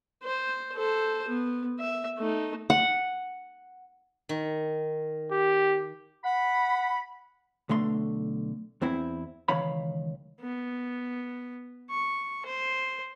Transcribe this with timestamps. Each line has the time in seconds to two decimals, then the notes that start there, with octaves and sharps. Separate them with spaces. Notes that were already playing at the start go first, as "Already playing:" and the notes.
0.23 C5
0.75 A4 C5
1.28 B3
1.79 E5
2.18 A3 D#4
2.70 F#5
4.29 D#3
5.32 G4
6.24 F#5 B5
7.69 B1 D3 A3 C6
8.82 E2 C4 E4
9.48 C#2 D#3 E3 C#5 F5 B5
10.41 B3
11.90 C#6
12.46 C5